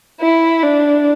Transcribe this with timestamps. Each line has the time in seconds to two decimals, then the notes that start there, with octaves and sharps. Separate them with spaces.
0.20 E4
0.63 D4